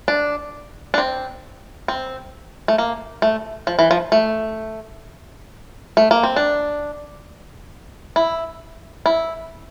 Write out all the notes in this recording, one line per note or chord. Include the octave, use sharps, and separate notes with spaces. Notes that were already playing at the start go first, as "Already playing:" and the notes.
D4
D4
C4
C4
A3
A#3
A3
F3
E3
F3
A3
A3
A#3
C4
D4
E4
E4